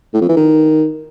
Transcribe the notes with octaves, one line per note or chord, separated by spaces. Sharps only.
A2
F2
E3
D#3